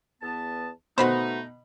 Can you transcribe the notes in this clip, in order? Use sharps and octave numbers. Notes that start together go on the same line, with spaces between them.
E2 B3 A5
B2 A3 D#4 F#4 B4 C5 B5